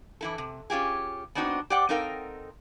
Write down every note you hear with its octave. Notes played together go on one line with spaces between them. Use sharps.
E3 E4 A4
C3
C#4 F4 G4 G#4
B3 C4 D4 D#4 F#4
G4 C5 D5 F#5 G5
C4 D#4 A4 A#4 F5 G5